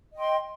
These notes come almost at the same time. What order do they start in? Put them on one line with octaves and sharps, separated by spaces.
D#5 G5 C6